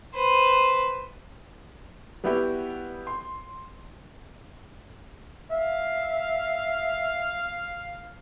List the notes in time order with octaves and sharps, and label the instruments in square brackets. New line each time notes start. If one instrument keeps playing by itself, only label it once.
[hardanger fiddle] B4 C5
[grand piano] G3 B3 E4 F#4 G4
C6
[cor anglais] E5 [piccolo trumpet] F5